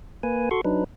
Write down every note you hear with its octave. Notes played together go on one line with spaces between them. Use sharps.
A#3 B4 G#5
F#4 A4 C6 C#6
F#3 D4 D#4 B4